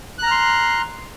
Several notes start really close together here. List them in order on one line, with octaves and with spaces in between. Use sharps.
F#6 A#5 F6 C6